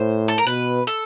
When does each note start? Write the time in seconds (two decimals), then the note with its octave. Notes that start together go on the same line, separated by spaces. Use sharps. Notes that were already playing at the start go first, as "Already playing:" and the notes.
Already playing: A2 C5
0.28 A4
0.38 A#4
0.46 B2 B4
0.87 A4